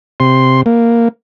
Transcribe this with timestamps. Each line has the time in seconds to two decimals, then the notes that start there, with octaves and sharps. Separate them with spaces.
0.20 C3 C6
0.66 A#3